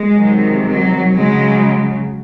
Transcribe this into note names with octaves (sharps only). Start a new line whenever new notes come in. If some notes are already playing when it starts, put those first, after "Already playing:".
Already playing: G#3
C3 D#3 F#3
F#3
C#3 F#3 G#3